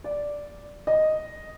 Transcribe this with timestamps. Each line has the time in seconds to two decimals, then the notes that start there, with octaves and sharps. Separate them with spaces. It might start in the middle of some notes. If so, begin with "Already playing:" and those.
0.04 D5
0.87 D#5